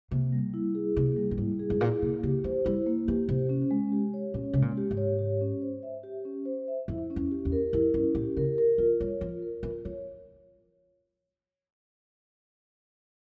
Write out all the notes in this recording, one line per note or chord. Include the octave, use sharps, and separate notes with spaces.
C3 A#3
G3
E4
G#4
C3 A#3
G3
A#2
G#2 E4
G#4
G#2
A#2 E4
C3 A#3
C#3 G4
E3 C5
G3 E4
A#3
E3 G4
C3 C5
C#4
G#3
G4
C#5
A#2 C#4
C3 G#3
A#2
G4
G#2
C#5
G4
C#4
C5
E5
G4
C#4
C5
E5
F2 E4
C#4
E2
G4
E2
A#4
F2 E4
G2 C#4
A#2 G4
C#3 A#4
A#4
F3 F4
G3 C#5
F3 F4
A#4
E3 F4
E3 C#5